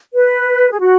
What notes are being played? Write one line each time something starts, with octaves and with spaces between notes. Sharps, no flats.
B4
G#4
F#4